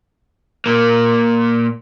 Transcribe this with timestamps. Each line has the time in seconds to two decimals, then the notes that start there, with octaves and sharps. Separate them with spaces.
0.66 A#2 A#3